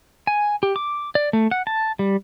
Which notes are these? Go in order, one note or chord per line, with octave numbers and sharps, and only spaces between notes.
G#5
G4
D6
D5
A3
F#5
A5
G3